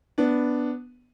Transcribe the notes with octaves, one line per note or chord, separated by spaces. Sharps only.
B3 D4